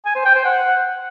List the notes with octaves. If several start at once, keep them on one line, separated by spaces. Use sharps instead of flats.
G#5
C5
G5
C5
F#5